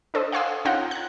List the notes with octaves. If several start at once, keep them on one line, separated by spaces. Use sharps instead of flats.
D4 A4 C5 D#5
F5 F#5 G#5 C6 D#6 E6
C#4 D#4 F4 F#5 G5 A#5
F#6 G#6